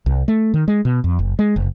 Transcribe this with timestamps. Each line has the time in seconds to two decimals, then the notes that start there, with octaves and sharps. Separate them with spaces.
0.06 C2
0.28 A3
0.54 D#3
0.68 G#3
0.85 B2
1.04 F2
1.19 F#1
1.39 G#3
1.56 F#1